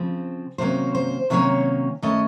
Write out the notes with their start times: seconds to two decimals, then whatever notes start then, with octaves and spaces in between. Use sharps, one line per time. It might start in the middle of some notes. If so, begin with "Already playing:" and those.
Already playing: C#3 F3 C4
0.58 C3 D#3 F#3 A#3 C#4 C5
0.95 C5
1.30 C3 D#3 F#3 A#3 C#4 C#5
2.02 D#3 A3 C#4 D#5